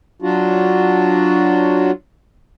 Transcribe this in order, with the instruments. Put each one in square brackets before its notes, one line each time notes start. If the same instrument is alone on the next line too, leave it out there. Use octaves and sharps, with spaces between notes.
[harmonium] F#3 D4 F4 F#4